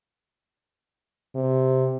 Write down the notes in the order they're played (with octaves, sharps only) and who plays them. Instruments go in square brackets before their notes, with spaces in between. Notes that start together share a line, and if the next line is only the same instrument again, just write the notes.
[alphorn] C3